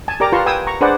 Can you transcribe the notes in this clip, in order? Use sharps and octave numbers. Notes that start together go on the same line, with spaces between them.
G#5 A5
G4 A#4 D5 A#5 D6
F4 B4 A5 A#5 C6 C#6
B4 G5 G#5 D#6 E6
A#5 C#6
D4 G#4 B4 C5 D5 F#5